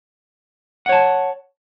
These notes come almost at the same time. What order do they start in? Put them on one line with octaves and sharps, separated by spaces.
F#5 C#5 A5